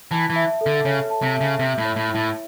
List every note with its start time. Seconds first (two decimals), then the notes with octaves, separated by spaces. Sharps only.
0.11 E3 A5
0.30 E3
0.36 E5
0.61 A4
0.66 D3
0.85 C#3 C#5
1.10 A5
1.22 C3
1.34 E5
1.41 C#3
1.59 C3 E5
1.78 A2
1.85 C#5
1.96 A2
2.09 E4
2.15 A2